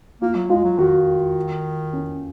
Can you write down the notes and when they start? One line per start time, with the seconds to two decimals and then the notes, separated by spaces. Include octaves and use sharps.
0.21 A#3 F4
0.35 F#3
0.50 G#3 F4
0.64 F#3
0.79 D#3 F#4
1.93 C#4